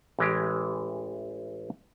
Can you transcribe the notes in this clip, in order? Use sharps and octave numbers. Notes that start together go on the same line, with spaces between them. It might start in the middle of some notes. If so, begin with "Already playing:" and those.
A1 E3 G#3 G4